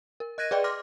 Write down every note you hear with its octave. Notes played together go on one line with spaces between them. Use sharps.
A#4
D#5 F#6 G#6 A#6 D#7
G#4 B4 D5 D#5 G5
C6 D6 F6 A#6